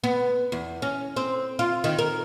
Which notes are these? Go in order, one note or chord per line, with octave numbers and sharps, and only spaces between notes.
B3
E2
C#4
C4
F4
D#3
A#4